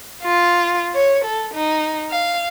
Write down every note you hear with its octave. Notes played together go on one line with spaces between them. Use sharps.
F4
C#5
A4
D#4
F5